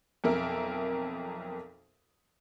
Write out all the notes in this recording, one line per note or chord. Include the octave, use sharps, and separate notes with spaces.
B1 F2 A#4 E5